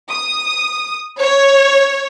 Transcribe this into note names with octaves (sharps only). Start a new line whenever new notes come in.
D#6
C#5